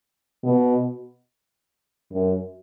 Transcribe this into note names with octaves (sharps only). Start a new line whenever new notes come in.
B2
F#2